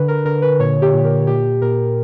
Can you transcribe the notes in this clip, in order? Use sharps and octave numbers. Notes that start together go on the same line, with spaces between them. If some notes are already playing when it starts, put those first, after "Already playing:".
Already playing: D3 B4
A#4
D3 A#4
B4
A#2 C#5
G4
A#2
A#4
A#2 G4
A#2 A#4